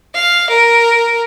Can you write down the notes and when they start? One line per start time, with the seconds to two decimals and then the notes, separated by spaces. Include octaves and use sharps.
0.15 F5
0.50 A#4